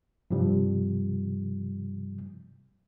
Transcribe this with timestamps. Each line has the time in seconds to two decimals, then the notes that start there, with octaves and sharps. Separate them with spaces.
0.31 G2 C3 F3 G3